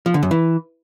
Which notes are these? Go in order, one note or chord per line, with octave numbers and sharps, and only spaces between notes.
F3
D3
F#2
E3